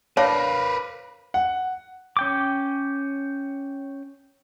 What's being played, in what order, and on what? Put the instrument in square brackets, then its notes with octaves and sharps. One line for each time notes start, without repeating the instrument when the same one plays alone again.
[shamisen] D4 [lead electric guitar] A#4 B4 [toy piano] C#5 [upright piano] F5 D6 A#6
[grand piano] F#5
[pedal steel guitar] C#4 G5 D6